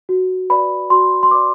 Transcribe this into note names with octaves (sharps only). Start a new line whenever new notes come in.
F#4
B4 D5 B5
F#4 C6
C6
B4 D5 D6